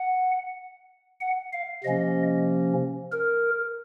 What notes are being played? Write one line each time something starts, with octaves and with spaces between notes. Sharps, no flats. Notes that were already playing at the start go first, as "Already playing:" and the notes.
Already playing: F#5
F#5
F5
C3 F3 A#3 C#4 D#5
A#4